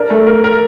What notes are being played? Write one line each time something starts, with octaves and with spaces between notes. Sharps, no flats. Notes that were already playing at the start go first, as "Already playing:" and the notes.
Already playing: D4 A#4
A3
A#4
A#4